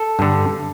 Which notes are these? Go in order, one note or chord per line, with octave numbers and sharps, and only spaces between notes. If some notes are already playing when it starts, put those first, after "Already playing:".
Already playing: A4
G2 D3